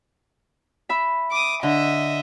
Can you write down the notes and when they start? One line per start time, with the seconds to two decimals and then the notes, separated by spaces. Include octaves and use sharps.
0.89 E5 B5
1.32 D6 D#6
1.63 D3 D#5 E5